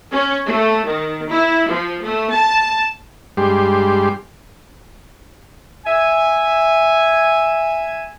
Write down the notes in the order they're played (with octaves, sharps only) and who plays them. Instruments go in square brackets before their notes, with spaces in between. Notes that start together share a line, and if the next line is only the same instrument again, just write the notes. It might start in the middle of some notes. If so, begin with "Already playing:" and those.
[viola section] C#4
A3
D#3
E4
F3
A3
A5
[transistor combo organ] G2 G3 G#3 G4 C6
[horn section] E5 G#5